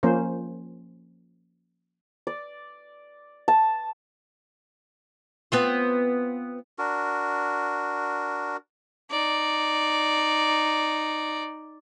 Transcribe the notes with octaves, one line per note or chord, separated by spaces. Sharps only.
F3 A#3 C#4 C5
D5
A5
B3 C4 F4
D4 F#4 A#4
D#4 D5